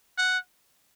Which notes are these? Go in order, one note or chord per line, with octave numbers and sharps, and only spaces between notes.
F#5